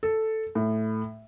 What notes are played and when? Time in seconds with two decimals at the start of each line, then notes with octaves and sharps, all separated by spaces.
0.03 A4
0.55 A2